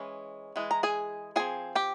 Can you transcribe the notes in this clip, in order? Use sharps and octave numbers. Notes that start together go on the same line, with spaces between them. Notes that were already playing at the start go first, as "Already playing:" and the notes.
Already playing: E3 G#3 C#4
E3 G#3
A#5
G#4 G#5
F3 C4 G#4 G#5
G4 G5